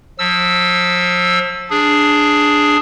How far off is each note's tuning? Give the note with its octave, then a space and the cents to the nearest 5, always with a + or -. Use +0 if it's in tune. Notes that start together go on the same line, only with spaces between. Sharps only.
F3 +35 E6 +0
D4 +0 G#4 +0